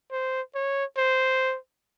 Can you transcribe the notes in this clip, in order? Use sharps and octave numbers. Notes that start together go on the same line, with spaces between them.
C5
C#5
C5